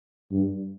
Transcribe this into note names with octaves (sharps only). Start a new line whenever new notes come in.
G2